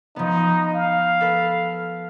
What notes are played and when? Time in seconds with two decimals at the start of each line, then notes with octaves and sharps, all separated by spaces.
0.16 F3 B3 D#4
0.74 F5
1.21 A4 B4